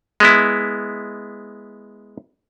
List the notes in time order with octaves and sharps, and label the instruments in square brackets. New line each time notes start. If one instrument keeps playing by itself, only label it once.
[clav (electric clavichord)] G#3 B3 E4